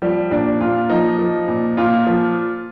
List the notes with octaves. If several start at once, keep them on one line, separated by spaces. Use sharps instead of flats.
F3 G3 G4
A#2 D4 D5
A#2 F4
F3 D#4
F3
A#2
A#2 F4
F3